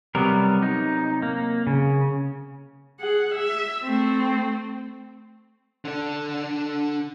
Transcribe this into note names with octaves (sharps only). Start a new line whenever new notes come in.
C3 F#3 G3 B3 A#4
D#4
A#3
C#3
G#4 F#5
E5
A3 C4
D3 D4